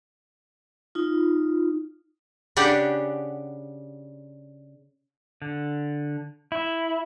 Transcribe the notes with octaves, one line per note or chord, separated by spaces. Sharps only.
D#4 F4
C#3 D4 G4 F#5
D3
E4